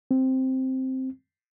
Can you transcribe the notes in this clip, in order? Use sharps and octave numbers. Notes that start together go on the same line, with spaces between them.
C4